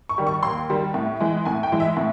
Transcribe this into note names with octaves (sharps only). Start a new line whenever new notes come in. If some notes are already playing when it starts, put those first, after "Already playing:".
C#6
D#3 G3
C#6
D#2 C6
D#3 G3
A2
E3 G#3
A2 G#5
G5
E3 G#3
E5
A2